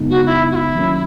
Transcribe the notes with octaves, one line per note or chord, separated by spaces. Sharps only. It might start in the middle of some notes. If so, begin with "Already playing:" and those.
Already playing: F#2 C#3 G#3 B3 D#4
F#4
E4
F#4
E4
D#3 F#3 A#3 C#4